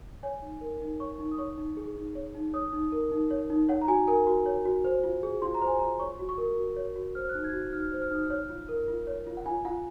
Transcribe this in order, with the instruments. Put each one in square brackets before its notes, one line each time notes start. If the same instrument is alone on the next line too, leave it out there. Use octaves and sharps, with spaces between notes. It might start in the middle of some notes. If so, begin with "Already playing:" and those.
[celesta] C#5 G#5
D#4
A#4
D#4
C#5 C#6
D#4 C#6
D#6
C#5 C#6
D#4
G#4
D#4
C#5
D#4
C#5 D#6
D#4
A#4
D#4
C#5
D#4
C#5 F#5
A#5
F#4 G#5
A#4 G#5
F#4
C#5
F#4
C5
F4
G#4
F4 C6
A#5
C5
G#5
F4 A#5
C#5 C#6
F#4
C#6
A#4
F#4
C#5
F#4
C5 F6
F#6
D#4
G#6
F#4
D#4 F6
C5
F6
D#4 D#6
F6
C#5
F4
A#4
F4
C#5
F4
F#5
F4 G#5
F4 F#5